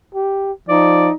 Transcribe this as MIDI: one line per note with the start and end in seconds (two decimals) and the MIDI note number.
0.14 0.52 67
0.69 1.09 53
0.69 1.14 63
0.69 1.10 74